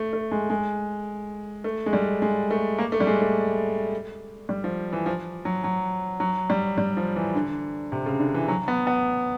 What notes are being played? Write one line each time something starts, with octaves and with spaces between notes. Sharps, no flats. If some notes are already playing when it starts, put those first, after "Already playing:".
Already playing: A3
A3
G#3
G#3
A3
G#3
G3
G#3
A3
A#3
A3
G3
G#3
A3
G3
F3
E3
F3
F#3
F#3
F#3
G3
G3
F3
E3
D3
C3
C#3
D3
E3
F#3
B3
B3